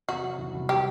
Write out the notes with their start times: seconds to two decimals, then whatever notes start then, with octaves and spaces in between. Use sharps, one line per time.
0.09 C3 F#4
0.23 F#3
0.38 C2
0.53 C2
0.69 C3 G4